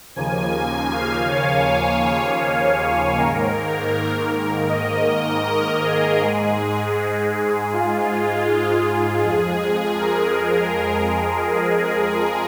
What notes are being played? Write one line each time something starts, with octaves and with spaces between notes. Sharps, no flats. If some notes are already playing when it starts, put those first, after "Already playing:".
D#2 C#3 F3 A#3 G#5
F5
C#5
G#2 D#3 A#3 A#4
D#5
A#4
G#4
G#2 G#3
F4
F2 F3 G#3 G#4
A#4
G#4